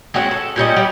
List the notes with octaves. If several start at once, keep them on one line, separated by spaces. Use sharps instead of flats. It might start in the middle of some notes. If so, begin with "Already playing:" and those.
G#3 C4 C#4 F#4
A4
A#2 G3 C#4 D#5
G3 G4